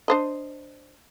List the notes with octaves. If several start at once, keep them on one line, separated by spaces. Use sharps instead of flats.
D4 C5 D#5